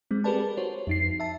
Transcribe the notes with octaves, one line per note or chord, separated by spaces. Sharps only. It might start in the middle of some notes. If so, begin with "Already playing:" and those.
G#3 C4
G4 G#4 A#4 B4 D5 A5
F#4 C5 C#5
F2 D#4 C7
E5 A5